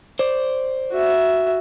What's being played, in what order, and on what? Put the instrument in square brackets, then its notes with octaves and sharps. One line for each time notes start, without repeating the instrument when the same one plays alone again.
[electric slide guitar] C5 D5
[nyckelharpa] F#4 E5